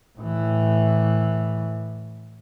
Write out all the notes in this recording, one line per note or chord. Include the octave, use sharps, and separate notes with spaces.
A2 E3